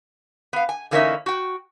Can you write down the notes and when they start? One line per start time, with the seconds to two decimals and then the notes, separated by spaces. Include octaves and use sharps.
0.53 B3 F5
0.69 G#5
0.91 D3 E3 A#3 C#4 D#4 E5
1.26 F#4 G5